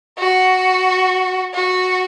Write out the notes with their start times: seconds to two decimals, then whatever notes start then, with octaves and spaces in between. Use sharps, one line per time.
0.19 F#4
1.54 F#4